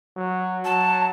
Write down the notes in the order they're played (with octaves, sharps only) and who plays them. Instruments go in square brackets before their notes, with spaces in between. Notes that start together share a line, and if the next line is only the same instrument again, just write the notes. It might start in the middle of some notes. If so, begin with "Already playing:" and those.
[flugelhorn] F#3
[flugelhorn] F#3 [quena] A5